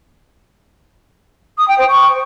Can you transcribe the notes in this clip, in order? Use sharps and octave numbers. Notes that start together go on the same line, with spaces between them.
D#6
G5
C5
C#6